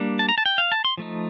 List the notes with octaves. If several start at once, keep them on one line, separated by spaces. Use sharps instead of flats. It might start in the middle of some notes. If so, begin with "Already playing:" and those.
Already playing: G3 A#3 D4
A5
A#5
A5
G5
F5
A5
C6
F3 A3 D#4